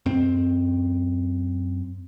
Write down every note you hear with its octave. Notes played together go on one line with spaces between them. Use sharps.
F#2 C4